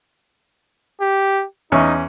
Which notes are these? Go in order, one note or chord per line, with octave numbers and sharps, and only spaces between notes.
G4
E2 C#4 D#4 C#6